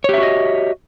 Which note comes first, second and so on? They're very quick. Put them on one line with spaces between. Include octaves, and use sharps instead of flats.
C#5 G4 E5 F#4 D#5